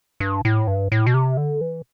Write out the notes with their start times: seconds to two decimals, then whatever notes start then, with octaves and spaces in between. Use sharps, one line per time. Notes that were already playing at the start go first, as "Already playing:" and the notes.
0.20 G2
0.45 A2
0.67 G2
0.92 A2
1.06 B2
1.14 C3
1.37 D3
1.61 E3